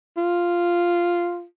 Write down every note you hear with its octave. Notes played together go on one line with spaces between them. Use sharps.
F4